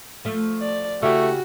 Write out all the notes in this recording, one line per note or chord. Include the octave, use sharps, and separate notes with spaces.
F3 A3
D5
C#3 A3 E4 F#4 G4